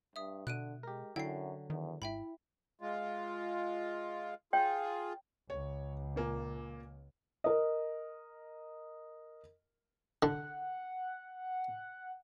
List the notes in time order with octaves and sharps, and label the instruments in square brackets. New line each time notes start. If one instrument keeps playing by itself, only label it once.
[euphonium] G2 [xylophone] E5 D#6
[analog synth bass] B2 [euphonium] D3 [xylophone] F#6 D7 D#7
[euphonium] G#3 [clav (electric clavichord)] G4 A#4
[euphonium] F#2 [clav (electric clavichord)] D3 F#3 [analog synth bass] E4 [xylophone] G5 C7
[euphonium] E2 [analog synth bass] D#3
[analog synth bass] G#1 [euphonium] E4 [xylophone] E5 G5 B5
[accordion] G#3 F4
[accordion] F4 G#4 [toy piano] C#5 G5
[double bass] C#2 [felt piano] C#5
[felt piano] A#2 A#3 G#5
A#4 D#5
[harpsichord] D3 [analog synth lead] F#5